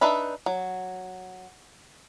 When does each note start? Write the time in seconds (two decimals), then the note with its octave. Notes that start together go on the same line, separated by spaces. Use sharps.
0.01 D4 D#4 B4 E5 B5
0.46 F#3